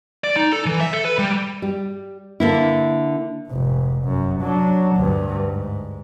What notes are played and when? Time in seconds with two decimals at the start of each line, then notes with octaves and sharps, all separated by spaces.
0.24 D5
0.36 D#4
0.52 A4
0.66 E3
0.81 E5
0.93 A4
1.05 B4
1.18 G3
1.62 G3
2.40 D3 A#3 E4
3.49 F1 G#2
4.03 F#2
4.41 F#3 D4
4.96 D2 G2
5.46 G#2